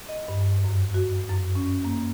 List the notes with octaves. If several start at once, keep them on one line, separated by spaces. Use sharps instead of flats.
D#5
G2
F#2
F#4
F#2
C#4
A#3